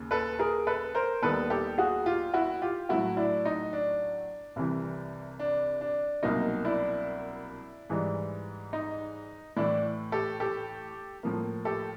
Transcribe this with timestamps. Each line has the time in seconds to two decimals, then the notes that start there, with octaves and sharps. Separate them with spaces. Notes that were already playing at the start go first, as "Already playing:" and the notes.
Already playing: D#2 C#3
0.11 A4 B4
0.39 G#4 A#4
0.67 A4 B4
0.95 A#4 C5
1.22 D#2 D#3 G3 B3 A4 B4
1.50 G4 A4
1.78 F#4 G#4
2.06 F4 G4
2.34 E4 F#4
2.62 F4 G4
2.89 A2 F#3 A3 E4 F#4
3.17 D4 E4
3.45 D#4
3.73 D4
4.56 C2 C3 E3
5.39 D4
5.81 D4
6.23 C2 B2 F#3 A#3 D#4
6.65 D4 E4
7.90 G#2 E3 G3
8.73 D#4
9.56 A2 E3 A3 D4 E4
10.12 G4 A4
10.40 G4 A4
11.23 A2 F3 A#3
11.65 G4 A4